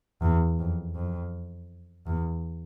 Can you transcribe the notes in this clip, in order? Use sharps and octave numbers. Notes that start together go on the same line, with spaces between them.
E2
F2
F2
E2